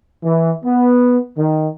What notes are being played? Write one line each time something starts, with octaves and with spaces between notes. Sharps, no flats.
E3
B3
D#3